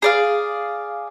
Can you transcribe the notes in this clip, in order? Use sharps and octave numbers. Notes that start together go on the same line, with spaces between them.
G#4 D5 F5